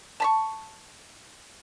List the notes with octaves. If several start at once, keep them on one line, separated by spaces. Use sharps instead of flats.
A5 B5 C#6